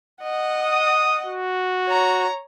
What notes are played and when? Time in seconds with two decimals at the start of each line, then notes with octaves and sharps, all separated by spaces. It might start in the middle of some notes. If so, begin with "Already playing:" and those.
0.23 D#5 F#5
0.63 D#6
1.26 F#4
1.88 C#5 A#5